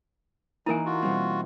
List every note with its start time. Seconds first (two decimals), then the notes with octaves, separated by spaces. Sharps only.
0.66 D#3 E3 A#3 D#4 E4 A#4 G#5
0.86 F4 F#4
1.02 B2 G3 C4